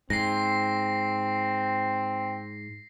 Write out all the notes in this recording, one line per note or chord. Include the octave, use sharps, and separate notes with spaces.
G#2 C4 A#6 C7